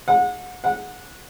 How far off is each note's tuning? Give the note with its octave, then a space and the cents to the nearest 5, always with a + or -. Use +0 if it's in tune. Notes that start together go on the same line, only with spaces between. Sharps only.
F#5 -30
F#5 -20